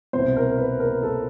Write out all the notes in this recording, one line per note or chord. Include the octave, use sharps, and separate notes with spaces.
C2 B2 C5
A#4
B4
A#4
A4